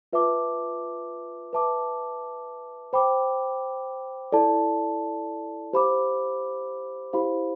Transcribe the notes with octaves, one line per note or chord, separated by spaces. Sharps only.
F4 B4 E5 A5 D6
B4 E5 A5 D6
C5 G5 B5 D6
E4 A4 D5 A5
G4 C5 F5 B5 D6
E4 G4 C5 F5 B5